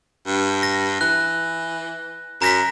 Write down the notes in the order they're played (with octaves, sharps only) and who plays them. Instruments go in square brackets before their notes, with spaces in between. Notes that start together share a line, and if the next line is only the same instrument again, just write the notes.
[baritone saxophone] G2
[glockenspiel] A#6
[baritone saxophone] E3 [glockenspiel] F#6
[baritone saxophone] F#2 [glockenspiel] A#5 A#6 B6